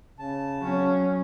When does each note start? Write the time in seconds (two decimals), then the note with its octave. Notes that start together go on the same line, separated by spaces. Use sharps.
0.19 C#3 A5
0.60 F#3 C#4